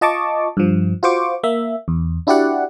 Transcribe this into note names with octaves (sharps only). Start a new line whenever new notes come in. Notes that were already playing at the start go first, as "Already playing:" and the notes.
F4 D#5 A5 C#6 D6
G2 F3
F4 F#4 C5 C#6 D6
A#3 E5
E2
D4 E4 F#4 G4 D5 F#5